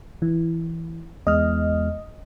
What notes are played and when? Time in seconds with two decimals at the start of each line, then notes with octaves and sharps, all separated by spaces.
0.22 E3
1.27 E2 G#3 D#5 F6